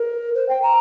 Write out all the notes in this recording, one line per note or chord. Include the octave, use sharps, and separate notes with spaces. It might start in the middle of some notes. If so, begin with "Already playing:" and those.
Already playing: A#4
C5
G5
A#5